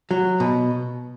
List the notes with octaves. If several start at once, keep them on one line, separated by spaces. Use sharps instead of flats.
F#3
B2